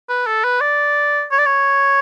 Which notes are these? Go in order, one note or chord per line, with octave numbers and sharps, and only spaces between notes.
B4
A4
B4
D5
C#5
D5
C#5